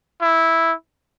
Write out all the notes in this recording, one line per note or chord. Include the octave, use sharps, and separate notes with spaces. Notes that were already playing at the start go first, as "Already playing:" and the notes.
E4